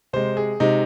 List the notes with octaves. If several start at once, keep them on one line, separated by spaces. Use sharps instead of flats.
C3 G#3 C5
G#4
C3 G#3 D#4